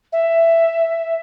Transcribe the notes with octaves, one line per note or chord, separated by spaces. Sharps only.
E5